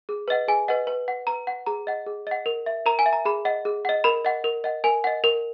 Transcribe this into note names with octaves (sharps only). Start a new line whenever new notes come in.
G#4
B4 D#5 F#5
G#4 G#5
B4 D#5 F#5
B4
F#5
B4 A#5
F#5
G#4 A#5
D#5 F#5
G#4
D#5 F#5
A#4
E5
A#4 A#5
G#5
E5
A#5
G#4 B5
D#5 F#5
G#4
D#5 F#5
A#4 B5
D#5 F#5
A#4
D#5 F#5
A#4 G#5
D#5 F#5
A#4